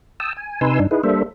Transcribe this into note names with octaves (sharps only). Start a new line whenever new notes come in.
G5 A5 D#6 E6
G#5
C3 D#4 B4 G#5 C6 E6
G2 D4 D#4
D#4 E4 G#4 B4
G3 A#3 D4 A4 C5 E5